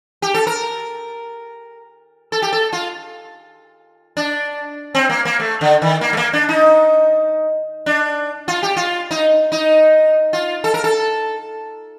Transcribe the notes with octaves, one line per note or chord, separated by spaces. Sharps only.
G4
A4
A#4
A4
G4
A4
F4
D4
C4
A#3
A#3
A3
D3
D#3
A#3
A3
A#3
D4
D#4
D4
F4
G4
F4
D#4
D#4
F4
A4
A#4
A4